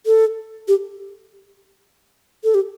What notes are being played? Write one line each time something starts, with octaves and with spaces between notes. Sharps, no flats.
A4
G4
A4
G4